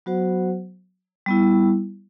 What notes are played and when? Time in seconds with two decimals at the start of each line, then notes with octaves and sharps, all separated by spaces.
0.06 F#3 B3 F#4 C5 F#5
1.26 G3 B3 E4